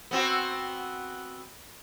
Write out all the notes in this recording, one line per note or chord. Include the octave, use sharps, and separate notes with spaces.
B3 C4 F#4